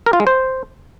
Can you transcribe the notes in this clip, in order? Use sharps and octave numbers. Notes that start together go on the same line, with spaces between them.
A#4
F4
G#3
C5